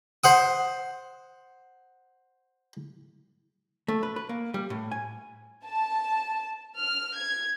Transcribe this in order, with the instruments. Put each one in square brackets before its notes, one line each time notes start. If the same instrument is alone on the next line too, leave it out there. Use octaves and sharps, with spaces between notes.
[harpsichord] C5 F#5 D#6
[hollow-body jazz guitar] A3
B4
B4
A#3
G3
A2
G#5
[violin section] A5
F6
G#6